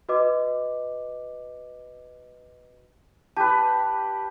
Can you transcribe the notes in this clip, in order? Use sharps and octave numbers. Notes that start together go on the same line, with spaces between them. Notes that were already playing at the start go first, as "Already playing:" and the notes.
F#4 B4 D#5 D6
G4 B4 A5